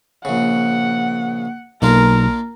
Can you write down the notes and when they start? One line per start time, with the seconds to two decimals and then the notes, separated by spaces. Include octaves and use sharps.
0.25 A#1 C#3 F#5
1.82 B1 A#3 D4 F4 A#4